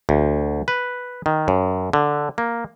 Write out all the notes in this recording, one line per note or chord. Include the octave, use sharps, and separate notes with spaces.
D2
B4
D#3
F#2
D3
A#3